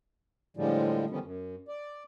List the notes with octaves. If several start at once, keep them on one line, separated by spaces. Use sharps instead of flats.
A2 D3 F3 G3 G#3
D3 D#3 F3 G3 B3 C#4
F#2
D5